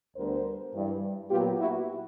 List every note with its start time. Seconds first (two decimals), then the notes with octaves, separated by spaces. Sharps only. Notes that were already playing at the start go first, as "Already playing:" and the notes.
0.16 D2 D3 G3 B3 A#4 C5
0.73 G2 E3 G3
1.30 A#2 F#3 B3 F4 G4
1.59 E4 F#4